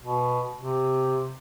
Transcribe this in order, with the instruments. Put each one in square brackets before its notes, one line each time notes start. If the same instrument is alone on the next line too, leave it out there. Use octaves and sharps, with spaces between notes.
[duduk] B2
C3